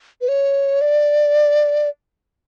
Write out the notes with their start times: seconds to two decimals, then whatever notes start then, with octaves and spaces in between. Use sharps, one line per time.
0.21 B4
0.29 C#5
0.81 D5